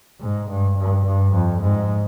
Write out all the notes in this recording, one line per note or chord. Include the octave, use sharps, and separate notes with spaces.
G#2
G2
G2
G2
F2
G#2